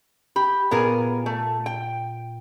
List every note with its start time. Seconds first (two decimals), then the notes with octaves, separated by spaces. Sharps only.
0.36 G4 B5
0.71 A#2 B3 G#4 A#4 D#7
1.26 A3
1.66 G5